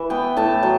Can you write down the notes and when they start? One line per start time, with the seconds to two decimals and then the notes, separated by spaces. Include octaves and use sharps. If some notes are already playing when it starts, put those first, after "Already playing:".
Already playing: E3 B4 E5
0.10 B3 G5
0.37 A2 A5
0.63 F#3